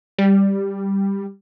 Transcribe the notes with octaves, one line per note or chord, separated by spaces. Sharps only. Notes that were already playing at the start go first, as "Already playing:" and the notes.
G3